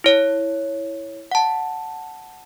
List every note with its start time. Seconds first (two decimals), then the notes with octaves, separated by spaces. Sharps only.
0.04 E4 C#5
1.31 F#5 A5